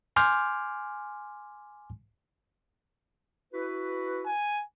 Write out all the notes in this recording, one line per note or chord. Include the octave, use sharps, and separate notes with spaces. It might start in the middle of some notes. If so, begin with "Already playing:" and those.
G#5 C6 D6 F6 G6
E4 F#4 B4
G#5